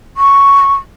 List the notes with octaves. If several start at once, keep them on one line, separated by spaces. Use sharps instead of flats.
C#6